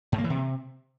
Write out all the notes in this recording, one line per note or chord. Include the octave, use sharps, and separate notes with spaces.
G#2
A#3
E3
C3